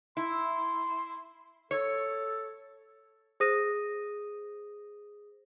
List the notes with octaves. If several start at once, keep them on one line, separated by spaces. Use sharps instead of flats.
E4 C6
A4 C#5
G#4 C5 D#6 A#6 D#7